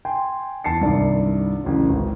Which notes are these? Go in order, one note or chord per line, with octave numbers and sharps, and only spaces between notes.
G5 G#5 C6
E2 A5 C7 C#7
C2 G2 D#3 D5
A1 C#3 F#3
G#1 C#2